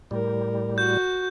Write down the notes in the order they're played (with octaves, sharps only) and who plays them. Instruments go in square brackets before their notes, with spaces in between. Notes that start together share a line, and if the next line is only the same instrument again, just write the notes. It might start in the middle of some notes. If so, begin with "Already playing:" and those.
[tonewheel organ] A2 G3 [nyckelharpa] A#4
[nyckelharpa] F#4 [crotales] G6